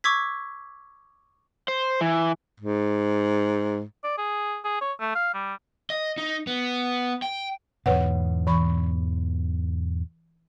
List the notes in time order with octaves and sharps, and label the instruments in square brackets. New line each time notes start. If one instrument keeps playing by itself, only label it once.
[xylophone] C#6 D6 E6 G#6 B6
[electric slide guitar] C5
E3
[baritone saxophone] G#2
[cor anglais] D5
G#4
G#4
C#5
A3
F5
G3
[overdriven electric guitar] D#5
D#4
B3
G5
[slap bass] E2 G#2 B2 [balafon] B4 C#5 F#5
[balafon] E3 B5 C#6